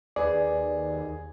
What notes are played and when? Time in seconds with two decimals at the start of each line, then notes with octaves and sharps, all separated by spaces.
0.16 D#2 G#4 B4 D5